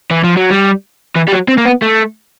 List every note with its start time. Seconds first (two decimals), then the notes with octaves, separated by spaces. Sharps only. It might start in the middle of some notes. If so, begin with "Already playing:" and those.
0.11 E3
0.24 F3
0.37 F#3
0.51 G3
1.16 E3
1.28 G3
1.32 F#3
1.48 C4
1.58 A#3
1.65 B3
1.82 A3